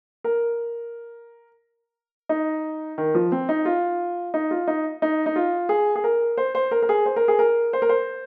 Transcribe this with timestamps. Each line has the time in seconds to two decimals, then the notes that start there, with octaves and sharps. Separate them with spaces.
0.24 A#4
2.29 D#4
2.98 D#3
3.15 F3
3.32 C4
3.49 D#4
3.65 F4
4.34 D#4
4.51 F4
4.67 D#4
5.02 D#4
5.26 D#4
5.36 F4
5.69 G#4
5.96 G#4
6.04 A#4
6.37 C5
6.55 C5
6.71 A#4
6.82 A#4
6.89 G#4
7.06 C5
7.16 A#4
7.28 G#4
7.39 A#4
7.73 C5
7.82 A#4
7.89 C5